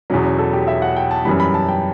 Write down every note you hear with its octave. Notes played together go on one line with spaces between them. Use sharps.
E2 B2 F#3 C#4
C#4
A4
G4
E5
F#5
G5
A5
F#2 E3 G3 B5
B5
A5
G5